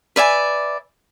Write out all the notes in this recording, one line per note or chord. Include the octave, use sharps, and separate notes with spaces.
B4 D5 E5 G#5